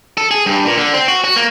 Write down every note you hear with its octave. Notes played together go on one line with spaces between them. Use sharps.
A4
G#4
G2
A#2
D3
C4
F#4
F#4
A#3